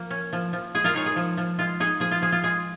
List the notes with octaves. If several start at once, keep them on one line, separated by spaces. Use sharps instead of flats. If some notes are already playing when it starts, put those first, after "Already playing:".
Already playing: F3 A#3
C#4
F3
F3
G#3 G#4
F4 A#4
D#4 G#4 C#5
G#4
F3
F3
G#3 F4
D#4 G#4
F3 G#4
F4
F3 G#4
F4
G#3 G#4